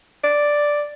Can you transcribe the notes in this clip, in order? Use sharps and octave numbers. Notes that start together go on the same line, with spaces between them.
D5